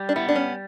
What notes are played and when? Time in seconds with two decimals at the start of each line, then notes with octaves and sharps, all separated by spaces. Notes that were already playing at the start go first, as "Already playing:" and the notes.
Already playing: G3
0.09 D4
0.16 B3 E4
0.29 D4
0.35 C#4